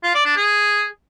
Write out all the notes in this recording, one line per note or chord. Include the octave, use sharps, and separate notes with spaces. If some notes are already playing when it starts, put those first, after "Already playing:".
F4
D5
D4
G#4